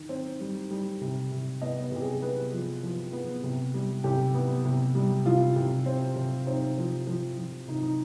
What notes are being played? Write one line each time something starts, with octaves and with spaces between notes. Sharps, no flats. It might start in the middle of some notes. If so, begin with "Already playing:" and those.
Already playing: D#3
C4
G3
G3
C3
C3
B3 D#5
B4
C3 G4
G#4
B3 B4
F3
F3
B3
C3
G3
C3 G4
B3
C3
G3
C3 F4
C3
C4
C3
C4 D#4
F3
F3
F3
C3 D#4
D#4